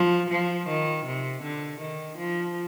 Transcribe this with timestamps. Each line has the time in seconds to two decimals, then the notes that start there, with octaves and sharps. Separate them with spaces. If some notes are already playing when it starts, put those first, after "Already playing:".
Already playing: F3
0.30 F3
0.68 D#3
1.06 C3
1.43 D3
1.80 D#3
2.18 F3